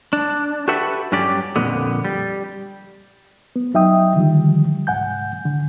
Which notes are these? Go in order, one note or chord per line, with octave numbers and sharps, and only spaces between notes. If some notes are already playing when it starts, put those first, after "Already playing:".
D4
F#4 G4 A4 B4 E5 F#5
G2 F#3 C#4 G4 D5
F2 A#2 D3 B3
G3
B3
F#2 F#3 D#4 E5 G5 D#6
D3 D#3 F3 G3
C2 G#2 F#5 G#5 G6
D3